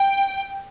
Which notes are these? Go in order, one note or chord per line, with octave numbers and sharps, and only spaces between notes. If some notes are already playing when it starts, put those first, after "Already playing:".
Already playing: G5